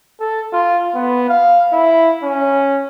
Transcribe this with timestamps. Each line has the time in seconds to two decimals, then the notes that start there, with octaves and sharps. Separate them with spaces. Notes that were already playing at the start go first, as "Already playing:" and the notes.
0.20 A4
0.53 F4
0.95 B3
1.29 F5
1.73 E4
2.23 C#4